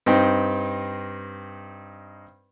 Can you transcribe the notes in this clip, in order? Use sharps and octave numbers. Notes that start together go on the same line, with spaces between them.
G2 C4 D#4 G5